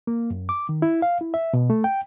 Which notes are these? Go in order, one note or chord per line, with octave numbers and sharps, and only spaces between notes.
A#3
F#2
D6
D#3
E4
F5
E4
E5
B2
A3
G5